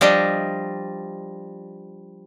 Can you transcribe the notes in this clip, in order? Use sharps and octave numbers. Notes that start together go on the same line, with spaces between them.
F3 G3 D4 D#5